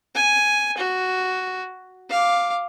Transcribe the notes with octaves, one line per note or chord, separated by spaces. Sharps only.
G#5
F#4
F5 D6